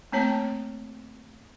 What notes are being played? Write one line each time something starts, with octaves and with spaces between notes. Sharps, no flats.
A3 A#3 C4 C#5 A5